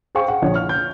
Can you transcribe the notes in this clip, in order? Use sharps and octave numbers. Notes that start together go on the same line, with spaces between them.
G#4 C5 F5 G5 G#5 C#6
F#5
A#1 F3 C#5
F6
G6